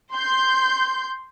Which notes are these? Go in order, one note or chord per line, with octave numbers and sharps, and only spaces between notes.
C6 G6